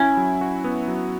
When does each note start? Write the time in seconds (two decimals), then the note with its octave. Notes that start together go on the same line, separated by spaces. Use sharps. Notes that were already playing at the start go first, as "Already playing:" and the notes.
Already playing: C#4 E4
0.17 F#3
0.41 F#4
0.64 B3
0.88 F#3